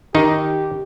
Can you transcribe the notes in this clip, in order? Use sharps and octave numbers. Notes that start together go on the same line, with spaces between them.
D#3 D#4 G4